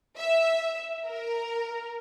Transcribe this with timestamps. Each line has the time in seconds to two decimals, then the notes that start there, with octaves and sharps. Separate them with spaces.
0.17 E5
1.06 A#4